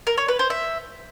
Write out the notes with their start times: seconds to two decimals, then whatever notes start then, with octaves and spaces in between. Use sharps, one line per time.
0.07 A#4
0.18 C#5
0.28 B4
0.39 C5
0.50 E5